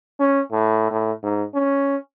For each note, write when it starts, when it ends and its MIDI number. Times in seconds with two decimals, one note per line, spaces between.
0.20 0.41 61
0.52 0.91 45
0.91 1.12 45
1.23 1.44 44
1.55 1.97 61